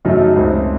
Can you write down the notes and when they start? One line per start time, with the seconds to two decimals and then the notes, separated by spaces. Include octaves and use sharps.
0.05 F#2 C#3 F#3 A3 D#4
0.36 C#2 C#3 A3 C4